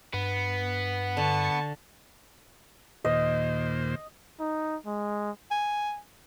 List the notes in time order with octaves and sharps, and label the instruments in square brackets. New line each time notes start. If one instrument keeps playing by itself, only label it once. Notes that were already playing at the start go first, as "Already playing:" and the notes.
[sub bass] G2 [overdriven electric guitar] B3
[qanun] D3 [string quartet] A5 C#6
[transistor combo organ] D#2 A#2 C5 [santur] D#5
[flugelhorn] D#4
G#3
[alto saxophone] G#5